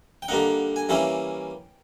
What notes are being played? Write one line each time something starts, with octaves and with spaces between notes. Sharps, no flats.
G5
D3 G3 A#3 D#4 F#5
G#5
E3 G3 A#3 C#4 E4 G5